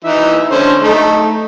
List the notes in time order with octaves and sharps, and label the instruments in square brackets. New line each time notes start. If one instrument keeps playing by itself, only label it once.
[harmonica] E3 D#4 E5
D3 C#4 C5
A3 D#4